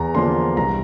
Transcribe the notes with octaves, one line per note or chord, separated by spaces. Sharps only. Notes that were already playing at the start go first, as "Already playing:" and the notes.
Already playing: E2 A#5
D3 F3 A#3 D4 C6
C2 A#5